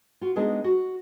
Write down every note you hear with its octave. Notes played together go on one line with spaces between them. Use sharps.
F4 F#4
G#3 B3 D4 D#4 G#4
F#4